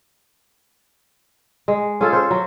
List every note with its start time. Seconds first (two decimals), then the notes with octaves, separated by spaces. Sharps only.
1.68 G#3
2.01 C#4 F4 G#4 A4
2.13 A4 C5
2.31 F#3